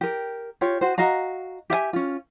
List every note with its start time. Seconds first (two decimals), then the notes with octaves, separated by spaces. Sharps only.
0.01 G4 A#4
0.61 F4 G4 C#5
0.81 F#4 C5
0.98 F#4 D#5 F5 A#5
1.70 G4 E5 F5 G#5
1.93 C#4 F4